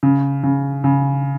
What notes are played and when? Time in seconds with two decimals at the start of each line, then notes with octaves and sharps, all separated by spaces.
0.03 C#3
0.43 C#3
0.84 C#3